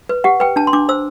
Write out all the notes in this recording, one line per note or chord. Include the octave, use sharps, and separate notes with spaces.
B4
G4 F#5
B4 G5
D4 A5
C6
D4 D6
C5 E6